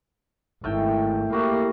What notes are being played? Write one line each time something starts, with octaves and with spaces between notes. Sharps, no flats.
G#1 A2 A3 G5
A#3 E4 F#4 G4